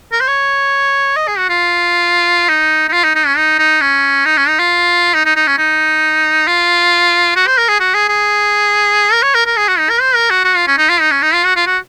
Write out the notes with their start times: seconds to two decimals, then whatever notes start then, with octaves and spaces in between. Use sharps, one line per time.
0.12 A#4
0.20 C5
0.28 C#5
1.16 D#5
1.27 G#4
1.38 F#4
1.49 F4
2.49 D#4
2.88 D#4
2.93 F4
3.04 D#4
3.15 D#4
3.26 C#4
3.37 D#4
3.59 D#4
3.81 C#4
4.26 D#4
4.37 C#4
4.48 D#4
4.59 F4
5.14 D#4
5.25 D#4
5.36 D#4
5.47 C#4
5.58 D#4
6.47 F4
7.36 F#4
7.47 C5
7.58 A#4
7.68 G#4
7.80 F#4
7.94 G#4
8.09 G#4
9.12 A#4
9.23 C#5
9.35 A#4
9.46 A#4
9.57 G#4
9.68 F#4
9.78 D#4
9.89 A#4
10.01 C5
10.15 A#4
10.30 F#4
10.44 F#4
10.56 F4
10.67 C#4
10.78 D#4
10.89 F4
11.00 D#4
11.11 C#4
11.22 D#4
11.34 F4
11.45 F#4
11.56 F4
11.66 F#4